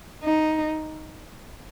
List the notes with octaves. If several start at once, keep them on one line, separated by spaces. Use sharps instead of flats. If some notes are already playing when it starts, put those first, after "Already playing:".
D#4